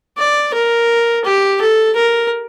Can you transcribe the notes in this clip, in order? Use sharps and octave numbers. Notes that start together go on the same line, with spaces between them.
D5
A#4
G4
A4
A#4